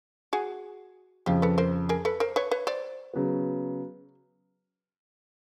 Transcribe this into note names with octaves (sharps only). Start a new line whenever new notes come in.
F#4 G#4
F2 C#3 F3 F4 G4
A4 B4
A#4 C5
G#4 A#4
A4 B4
A#4 C5
B4 C#5
B4 C#5
C5 D5
C#3 F#3 B3